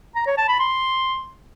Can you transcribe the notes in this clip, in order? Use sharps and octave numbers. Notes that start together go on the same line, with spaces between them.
A#5
C#5
A5
B5
C6